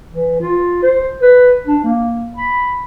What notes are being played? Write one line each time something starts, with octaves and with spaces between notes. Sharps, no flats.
E3
F4
C5
B4
D4
A#3
B5